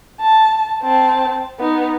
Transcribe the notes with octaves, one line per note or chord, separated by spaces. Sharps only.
A5
C4 A5
B3 D#4